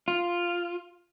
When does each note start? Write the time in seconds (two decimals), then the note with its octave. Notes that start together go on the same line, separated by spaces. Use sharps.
0.08 F4